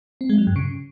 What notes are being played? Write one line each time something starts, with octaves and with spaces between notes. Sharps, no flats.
C4
G#3
F#3
G2
C#3